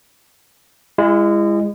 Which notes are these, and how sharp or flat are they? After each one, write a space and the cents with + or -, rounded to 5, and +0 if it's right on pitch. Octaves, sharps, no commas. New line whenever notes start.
G#3 -25 E4 +35